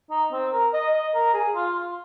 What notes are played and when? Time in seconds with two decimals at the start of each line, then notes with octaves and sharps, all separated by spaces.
0.10 D#4
0.32 C4
0.53 A#4
0.73 D#5
0.94 D#5
1.14 A#4
1.34 G#4
1.55 F4
1.75 F4